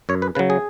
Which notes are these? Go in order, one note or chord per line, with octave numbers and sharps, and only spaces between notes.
F#2 C#5
B4
C#3 F#3 B4
G#4